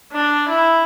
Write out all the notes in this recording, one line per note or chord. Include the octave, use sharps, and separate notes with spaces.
D4
E4